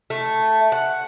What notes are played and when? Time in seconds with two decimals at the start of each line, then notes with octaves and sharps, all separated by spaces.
0.10 A3
0.72 F#5